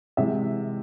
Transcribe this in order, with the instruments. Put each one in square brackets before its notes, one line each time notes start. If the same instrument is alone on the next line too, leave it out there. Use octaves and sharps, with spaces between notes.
[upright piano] C3 E3 G#3 E5